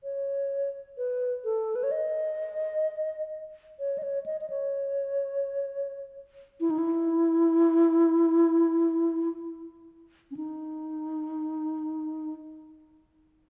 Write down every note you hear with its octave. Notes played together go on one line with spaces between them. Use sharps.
C#5
B4
A4
B4
C#5
D#5
C#5
D#5
C#5
D#5
D#5
C#5
E4
D#4
E4
C#4
D#4